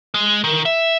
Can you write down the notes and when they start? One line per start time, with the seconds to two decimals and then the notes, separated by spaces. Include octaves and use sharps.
0.14 G#3
0.44 D#3
0.65 E5